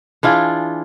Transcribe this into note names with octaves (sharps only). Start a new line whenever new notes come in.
E3 D4 F4 G#4